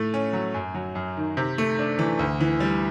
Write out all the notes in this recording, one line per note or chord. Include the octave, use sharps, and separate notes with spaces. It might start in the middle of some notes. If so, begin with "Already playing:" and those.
Already playing: A2 A3
C#4
F#3
F#2
F#3
F#2
D#3
C3
A3
D4
E3
D2
E3
G3